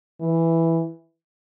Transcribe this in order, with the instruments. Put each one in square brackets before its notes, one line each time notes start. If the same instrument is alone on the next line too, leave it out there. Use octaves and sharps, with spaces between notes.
[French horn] E3